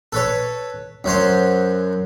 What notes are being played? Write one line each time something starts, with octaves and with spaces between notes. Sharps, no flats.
A4 B4 C#5
F#2 F#3 C5 C#5